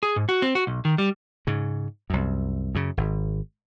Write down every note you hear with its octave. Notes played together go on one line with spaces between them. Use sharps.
G#4
G#2
F#4
C4
F#4
B1
D#3
G3
G#2 C#3
C2 F#2
F#2 C#3
G#1